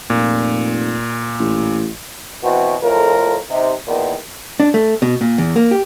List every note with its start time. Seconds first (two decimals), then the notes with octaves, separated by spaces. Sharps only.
0.10 F1 A#2
1.40 A1
2.43 B2 E3 C4 F#4
2.83 F2 A2 F4 A#4
3.50 C3 D#4
3.87 E2 A#2 D#3 B3
4.60 D4
4.74 A3
5.02 B2
5.21 A#2
5.38 E2
5.56 A#3
5.71 G4